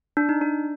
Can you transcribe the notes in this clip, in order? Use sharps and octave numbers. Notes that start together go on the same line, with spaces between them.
D4
D#4
D4